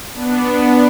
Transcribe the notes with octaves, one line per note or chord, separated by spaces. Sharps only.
B3 D4